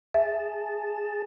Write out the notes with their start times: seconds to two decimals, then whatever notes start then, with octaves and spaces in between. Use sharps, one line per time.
0.14 G#4 E5 A5